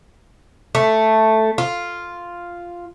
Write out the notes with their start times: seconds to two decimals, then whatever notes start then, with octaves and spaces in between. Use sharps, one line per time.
0.75 A3
1.58 F4